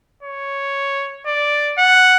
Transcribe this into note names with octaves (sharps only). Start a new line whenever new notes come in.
C#5
D5
F#5